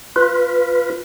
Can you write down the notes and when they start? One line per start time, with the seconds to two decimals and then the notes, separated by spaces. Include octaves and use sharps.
0.16 F4 B4